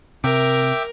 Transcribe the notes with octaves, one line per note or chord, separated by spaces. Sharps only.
C3 A#4 E5 G5 D6